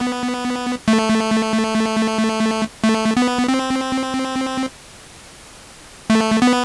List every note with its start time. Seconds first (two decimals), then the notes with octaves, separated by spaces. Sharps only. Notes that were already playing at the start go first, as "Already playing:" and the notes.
Already playing: B3
0.88 A3
2.84 A3
3.17 B3
3.48 C4
6.10 A3
6.42 B3